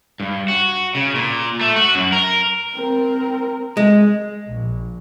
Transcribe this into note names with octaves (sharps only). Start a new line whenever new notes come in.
G2
F#4
C#3
A#2
A3
F#4
F#2
A#4
C4 A#4
G#3
A#1